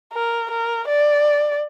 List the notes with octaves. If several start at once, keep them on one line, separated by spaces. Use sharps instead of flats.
A#4
A#4
D5